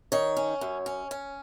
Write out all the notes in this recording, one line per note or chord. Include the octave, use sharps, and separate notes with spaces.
D#3 C#5
C#4
F#2
C#4
C#4